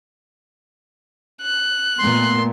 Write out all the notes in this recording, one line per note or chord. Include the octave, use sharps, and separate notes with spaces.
F#6
A#2 A3 B3 C6